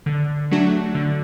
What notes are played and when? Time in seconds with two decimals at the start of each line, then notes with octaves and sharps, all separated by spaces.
0.06 D3
0.51 F#3 A3 D4 F#4
0.95 D3